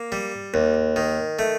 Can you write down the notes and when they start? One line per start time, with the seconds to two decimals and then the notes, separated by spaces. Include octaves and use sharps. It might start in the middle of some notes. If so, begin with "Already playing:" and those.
Already playing: A#3
0.12 G3
0.54 D#2
0.96 D#3
1.39 A3